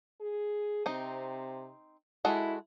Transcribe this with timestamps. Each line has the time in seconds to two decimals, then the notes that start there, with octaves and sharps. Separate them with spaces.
0.20 G#4
0.86 C3 C4 D#4
2.25 G#3 E4 F#4 A4